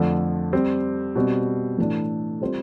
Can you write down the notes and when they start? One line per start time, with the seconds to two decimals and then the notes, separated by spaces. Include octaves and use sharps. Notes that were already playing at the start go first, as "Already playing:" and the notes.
Already playing: F2 D3 F3 A3
0.53 G3 C4 G4
1.16 B2 G3 C4
1.78 A2 E3 A3 D4
2.41 G3 C4 F4 C5